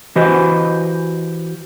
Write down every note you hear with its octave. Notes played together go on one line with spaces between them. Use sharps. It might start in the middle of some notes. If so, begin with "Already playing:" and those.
E3 F#4 G4 B4 C5 D#5